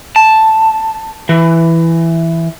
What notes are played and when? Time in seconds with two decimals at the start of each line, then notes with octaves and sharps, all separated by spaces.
0.16 A5
1.29 E3